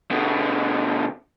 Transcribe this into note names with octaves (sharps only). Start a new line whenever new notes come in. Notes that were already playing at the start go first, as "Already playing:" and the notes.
B2 D3